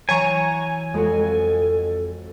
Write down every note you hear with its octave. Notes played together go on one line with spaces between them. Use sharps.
E3 F#3 C#5 G#5 A#5 C#6
F2 G#3 F#4 A4